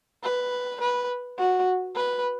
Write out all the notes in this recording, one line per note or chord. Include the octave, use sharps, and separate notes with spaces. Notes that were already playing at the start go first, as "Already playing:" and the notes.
B4
B4
F#4
B4